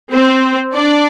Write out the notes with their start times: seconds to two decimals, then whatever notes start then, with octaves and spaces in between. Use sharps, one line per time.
0.12 C4 C5
0.73 D4 D5